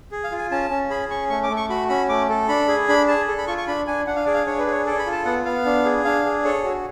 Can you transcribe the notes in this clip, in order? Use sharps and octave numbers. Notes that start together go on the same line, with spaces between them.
G#4
F5
F4
G#5
C#4 A5
C#4
G#4 B5
C#4 C#6
A3 C#6
D6
A3
C#6
F#4 B5
C#4 B5
A3 D6
A4
D4 B5
G#4
D4 B5
G#4 A5
A4
B5
F4 C#6
C#6
D4 B5
D4 G#5
D4 F#5
F5
G#4 D5
F5
D4 C#5
B4
G#4 C#5
A4 D5
B5
F4
A5
B3 F#5
B3 F5
D4
G#4
D4 F5
G#4
A4 C#5
F#4